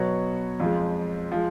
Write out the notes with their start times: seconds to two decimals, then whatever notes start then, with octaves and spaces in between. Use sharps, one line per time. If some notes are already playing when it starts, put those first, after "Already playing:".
Already playing: B2 F#3 B3 F#4 C#5
0.60 F2 F3 G#3
1.32 F3 G#3